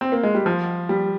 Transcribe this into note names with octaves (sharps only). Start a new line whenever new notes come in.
C4
A#3
G#3
G3
F3
G3